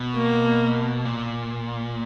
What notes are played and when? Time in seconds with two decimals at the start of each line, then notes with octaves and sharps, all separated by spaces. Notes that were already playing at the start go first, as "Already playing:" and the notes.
Already playing: B2
0.15 A#3
1.05 A#2